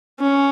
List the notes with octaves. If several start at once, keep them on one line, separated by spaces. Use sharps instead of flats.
C#4